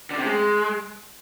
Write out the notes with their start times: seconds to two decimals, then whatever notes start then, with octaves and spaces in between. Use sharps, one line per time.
0.11 D3
0.18 C3
0.26 G#3